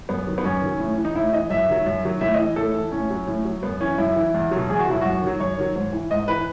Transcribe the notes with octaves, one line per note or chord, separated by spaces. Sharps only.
F#2 B3
D#3 F#3
B3
F#2 C#4
D#3 F#3
A2
E3
D#4
A2 E4
E3 D#5
F#2 E5
D#3 F#3
F#2
D#3 F#3
A2 E5
D#5
E3
A2 A4
E3
A2 C#4
F#3
A2
F#3
F#2 B3
E3 C#4
F#2 E4
E3
E2
B2 F#3
E2 G#4
F#4
B2 F#3 E4
F#2 F#4
D#3 F#3
F#2 C#5
D#3 F#3
G#2
E3
G#2 D#5
E3 B4